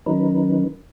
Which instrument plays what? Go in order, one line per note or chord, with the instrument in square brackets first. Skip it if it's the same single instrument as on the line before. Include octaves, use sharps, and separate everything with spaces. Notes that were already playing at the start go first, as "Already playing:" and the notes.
[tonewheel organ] D#3 F#3 C#4 D#4 A#4 B4